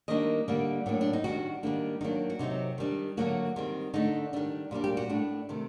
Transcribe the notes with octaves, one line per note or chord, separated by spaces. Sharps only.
D#3 G3 A#3 D4 D#5
D3 G3 A#3 D4
A2 F#3 A#3 D4
D4
D#4
D#3 G3 D4 F#4
D#3 G3 A#3 D4
D#3 F#3 A#3 D4 D#4
F#4
C3 F#3 C4 D#4
D#3 G3 D4
D3 F#3 A#3 F#4
D#3 G3 C4
D3 A3 D4 D#4
D#3 G3 D4
A#2 G3 A#3 D4
G4
F#4
A2 A3 D4
C3 D#3 A3